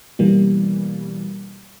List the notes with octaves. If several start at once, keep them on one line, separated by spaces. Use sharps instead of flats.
B2 E3 G3 A#3